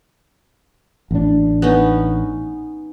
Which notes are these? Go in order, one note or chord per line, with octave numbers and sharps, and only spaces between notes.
A1 D4
B3 C#4 D#4